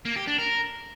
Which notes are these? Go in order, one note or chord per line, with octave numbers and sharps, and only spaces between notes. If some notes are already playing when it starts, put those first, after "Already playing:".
A#3
G4
D4
A#4